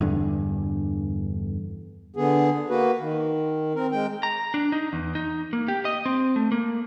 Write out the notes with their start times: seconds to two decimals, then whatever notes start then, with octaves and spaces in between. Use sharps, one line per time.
0.01 E2 G2 D3
2.16 D3 B3 G#4
2.70 A#3 F#4 B4
3.01 D#3
3.75 C4 A#4
3.92 G#3 G5
4.23 A#5
4.54 D4
4.72 D#4
4.93 E2
5.15 D#4
5.53 A#3
5.68 G4
5.85 D#5
6.06 C4
6.36 A3
6.52 A#3